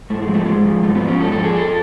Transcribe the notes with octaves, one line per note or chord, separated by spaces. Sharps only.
G#2 A3
G#3
F3
A3
G#2 G#3
F3
G#2 A3
B3
F3
C#4
G#2 A4
A4
F3
G#4
F2 A4